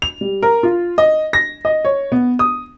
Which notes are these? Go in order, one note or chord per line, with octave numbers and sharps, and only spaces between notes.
F7
G3
A#4
F4
D#5
A#6
D#5
C#5
B3
D#6